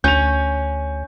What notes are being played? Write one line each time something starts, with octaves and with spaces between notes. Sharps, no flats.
D2 C#4 G6 F7